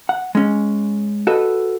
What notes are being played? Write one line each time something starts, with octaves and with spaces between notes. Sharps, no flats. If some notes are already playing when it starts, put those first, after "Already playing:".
F#5
G#3 C#4
F#4 A4 B4 D#5